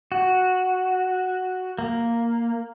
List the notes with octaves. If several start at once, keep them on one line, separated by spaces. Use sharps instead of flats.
F#4
A#3